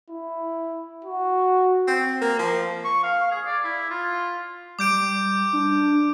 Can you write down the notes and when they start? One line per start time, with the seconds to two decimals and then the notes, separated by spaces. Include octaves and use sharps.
0.10 E4
1.05 F#4
1.87 C4
2.22 A#3
2.39 F3
2.84 C#6
3.03 F5
3.31 G#4
3.46 D5
3.64 E4
3.90 F4
4.79 G3 D6 G6 D7
5.53 D4